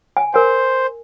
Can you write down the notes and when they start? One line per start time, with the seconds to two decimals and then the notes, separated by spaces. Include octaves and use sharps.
0.17 G#5
0.34 A#4 C5 G#5